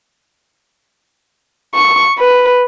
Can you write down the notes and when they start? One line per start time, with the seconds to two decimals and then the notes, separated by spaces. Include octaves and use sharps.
1.75 C#6
2.19 B4